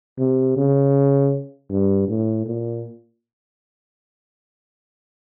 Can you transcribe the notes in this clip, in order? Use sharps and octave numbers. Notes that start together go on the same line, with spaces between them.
C3
C#3
G2
A2
A#2